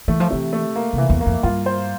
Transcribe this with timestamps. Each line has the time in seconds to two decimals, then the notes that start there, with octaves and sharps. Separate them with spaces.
0.08 E3 A3
0.20 F3
0.30 C3 E3
0.53 A3
0.76 A#3
0.93 C3 E3
1.10 E2
1.21 A#3
1.26 F2
1.43 G2 F4
1.66 C5